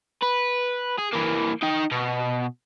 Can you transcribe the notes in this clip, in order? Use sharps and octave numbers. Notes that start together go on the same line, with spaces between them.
B4
G#4
E3 A#3
D#4 G5
B2